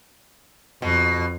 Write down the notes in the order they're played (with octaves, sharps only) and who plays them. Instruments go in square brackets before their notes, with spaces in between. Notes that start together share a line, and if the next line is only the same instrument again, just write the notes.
[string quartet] F2 [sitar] B2